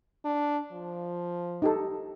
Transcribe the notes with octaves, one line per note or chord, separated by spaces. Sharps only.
D4
F3
D#4 G4 A4